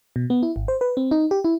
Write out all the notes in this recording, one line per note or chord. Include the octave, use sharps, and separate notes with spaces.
B2
B3
E4
G#1
C5
B4
C4
D#4
G4
E4